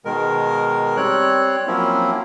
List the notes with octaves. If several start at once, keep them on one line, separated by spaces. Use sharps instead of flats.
B2 D#3 G#3 A#4
G3 C4 C#5 F#6
F3 F#3 A#3 C4 C#4 E4